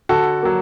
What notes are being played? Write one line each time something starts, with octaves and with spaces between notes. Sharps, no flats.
D3 F#4 A4
F#3 A#3